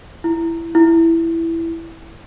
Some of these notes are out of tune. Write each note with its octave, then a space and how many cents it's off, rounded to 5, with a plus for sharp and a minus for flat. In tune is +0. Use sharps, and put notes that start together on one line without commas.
E4 +10
E4 +5